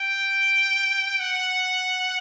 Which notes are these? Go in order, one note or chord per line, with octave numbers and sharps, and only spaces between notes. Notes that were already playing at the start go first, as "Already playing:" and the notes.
Already playing: G5
F#5